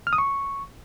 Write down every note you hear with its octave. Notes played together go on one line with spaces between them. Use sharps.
F6
D#6
C#6